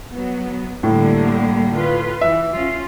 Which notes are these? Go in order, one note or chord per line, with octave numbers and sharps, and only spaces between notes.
F#3 B3
A2 D3 G3 A#3
F4 B4
E3 E5
C#4 F4